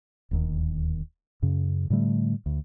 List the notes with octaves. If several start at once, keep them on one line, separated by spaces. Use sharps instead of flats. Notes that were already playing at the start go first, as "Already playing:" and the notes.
D1 D#2 D#3
F#2 C#3
A2 D3 G3 A3
D2